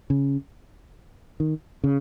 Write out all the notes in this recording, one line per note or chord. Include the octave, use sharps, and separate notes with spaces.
C#3
D#3
C#3